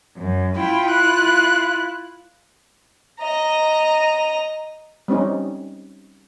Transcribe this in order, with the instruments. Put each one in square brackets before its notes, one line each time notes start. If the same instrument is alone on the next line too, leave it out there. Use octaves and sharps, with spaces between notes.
[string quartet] F#2
[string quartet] E4 F4 [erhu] G5
[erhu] F#6
[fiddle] D#5 A#5
[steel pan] G3 C4 C#4 D#4